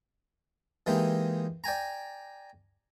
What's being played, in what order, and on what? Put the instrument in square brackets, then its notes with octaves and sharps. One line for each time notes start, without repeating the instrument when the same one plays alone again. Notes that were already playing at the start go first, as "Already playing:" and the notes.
[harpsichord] E3 G#3 A#3 D#4 G4
D5 G5 G#5 A#5